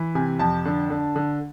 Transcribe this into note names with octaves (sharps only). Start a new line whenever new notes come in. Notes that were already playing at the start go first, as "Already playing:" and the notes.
Already playing: E3
C3 G#5
F2 A5
D3
D3
D3